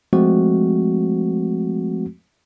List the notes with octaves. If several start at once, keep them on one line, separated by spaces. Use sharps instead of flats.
F3 G#3 A3 C4 F#4